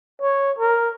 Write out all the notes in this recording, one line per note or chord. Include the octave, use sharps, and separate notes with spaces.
C#5
A#4